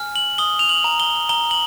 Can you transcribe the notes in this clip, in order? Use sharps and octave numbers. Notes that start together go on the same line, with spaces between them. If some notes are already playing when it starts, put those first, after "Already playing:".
Already playing: G#5 F6
F#7
D#6 G7
F7
F#7
A#5
G7
A#5 G7
F#7